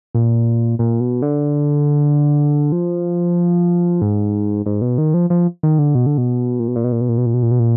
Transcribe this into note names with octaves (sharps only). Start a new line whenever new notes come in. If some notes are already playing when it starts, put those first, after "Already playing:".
A#2
A#2
B2
D3
F3
G#2
G#2
B2
D#3
F3
F3
D#3
D3
B2
D3
B2
A#2
B2
A#2
B2
A#2
B2
A#2
B2
A#2
B2
A#2
B2
A#2